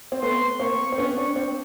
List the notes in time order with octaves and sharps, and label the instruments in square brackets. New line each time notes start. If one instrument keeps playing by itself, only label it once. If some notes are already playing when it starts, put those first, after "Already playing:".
[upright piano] C4
[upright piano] A3 B3 [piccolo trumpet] C6
[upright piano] A#3 C4 [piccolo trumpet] C#6
[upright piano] C4
[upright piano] B3 C#4 [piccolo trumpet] C#6
[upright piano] C4 D4
C4 D4